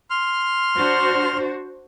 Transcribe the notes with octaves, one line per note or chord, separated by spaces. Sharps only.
C6 F6
D4 F#4 C5